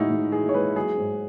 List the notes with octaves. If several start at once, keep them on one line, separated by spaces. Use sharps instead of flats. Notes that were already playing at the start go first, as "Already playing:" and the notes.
Already playing: A2 E3 G#3 D#4 E4 F#4
A2
E3 G#4
C#5
G#3 B4
F#3 G#4
G#2